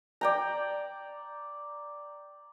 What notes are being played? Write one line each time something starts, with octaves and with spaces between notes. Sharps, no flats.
D5 G5 A#5